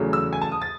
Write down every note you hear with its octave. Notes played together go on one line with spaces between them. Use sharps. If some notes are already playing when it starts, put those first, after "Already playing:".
Already playing: E2 C#3 F#3 A3
E6
G#5
A5
D#6
A6